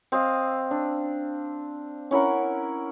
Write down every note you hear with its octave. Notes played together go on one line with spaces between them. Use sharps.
C4 D#5 F5
D4
C#4 E4 A#4 F#5